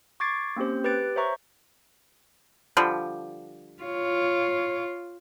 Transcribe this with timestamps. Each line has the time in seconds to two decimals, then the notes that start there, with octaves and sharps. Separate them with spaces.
0.20 C#6 D6 G#6 A6 C7 D7
0.56 A#3 C4 C#4 G4 C5
0.84 G4 B4 F#6 A6 D7
1.16 C5 C#5 E5 A#5 C#6
2.77 D3 F3 G3
3.84 F4 C#5